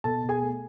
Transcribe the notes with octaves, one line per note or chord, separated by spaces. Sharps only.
B2 A4 A5
B2
G#4 G#5
A3